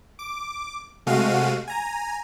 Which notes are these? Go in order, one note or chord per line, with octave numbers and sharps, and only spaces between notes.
D6
C3 G#3 A3 F#4 F5 D#7
G#5 A#5